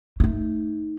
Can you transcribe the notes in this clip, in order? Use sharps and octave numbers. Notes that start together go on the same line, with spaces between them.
A3 D#4